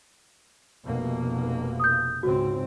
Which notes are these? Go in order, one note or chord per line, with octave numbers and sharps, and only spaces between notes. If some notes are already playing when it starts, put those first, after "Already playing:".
F1 B2 A#3
D#6 G6
C#2 G#2 C4 F#4